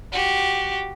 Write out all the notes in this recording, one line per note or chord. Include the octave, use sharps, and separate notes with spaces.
F#4 G4